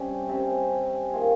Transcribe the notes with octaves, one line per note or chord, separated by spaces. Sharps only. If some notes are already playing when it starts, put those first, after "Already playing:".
Already playing: C3 G3 C#4
C3 G3 C#4
D#3 A#3 F4 G#4